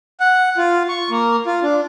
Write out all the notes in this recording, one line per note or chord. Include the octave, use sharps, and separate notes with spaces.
F#5
F4
C#6
A#3
F4
D4